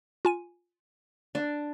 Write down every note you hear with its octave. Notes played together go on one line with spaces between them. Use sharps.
F4 G#5 D#7
D4